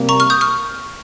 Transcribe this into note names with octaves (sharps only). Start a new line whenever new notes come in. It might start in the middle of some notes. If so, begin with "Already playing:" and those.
Already playing: C3 G3 A#3
A#5 C#6
C#6 F6
D#6 G6
C#6 F6